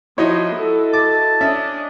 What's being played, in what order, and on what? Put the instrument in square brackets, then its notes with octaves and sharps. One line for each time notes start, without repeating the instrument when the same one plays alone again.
[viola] F3 [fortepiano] D#4 C#5 [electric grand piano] E4 F#4 D#5
[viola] A4
[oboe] A5 [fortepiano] D6
[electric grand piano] C#4 [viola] D4 D#5 [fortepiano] E5